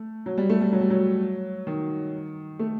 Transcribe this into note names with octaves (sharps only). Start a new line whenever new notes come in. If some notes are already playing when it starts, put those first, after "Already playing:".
Already playing: A3
F#3
G3
A3
G3
F#3
G3
F#3
D#3
A3